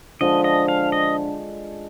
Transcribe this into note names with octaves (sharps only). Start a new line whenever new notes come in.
D3 F3 G#3 D4 D#5
D#5
F5
D#5